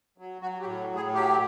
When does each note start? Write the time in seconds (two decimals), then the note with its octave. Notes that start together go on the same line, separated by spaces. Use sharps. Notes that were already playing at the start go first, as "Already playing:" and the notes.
0.18 F#3
0.42 F#3 F#4
0.60 G4
0.65 A2
0.90 A2
0.96 G#4
1.14 F#3 G4